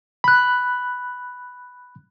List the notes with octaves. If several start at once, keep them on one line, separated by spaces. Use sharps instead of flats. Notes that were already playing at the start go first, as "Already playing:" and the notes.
B5 F#6